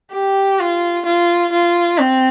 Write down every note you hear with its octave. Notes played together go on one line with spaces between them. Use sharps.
G4
F4
F4
F4
C4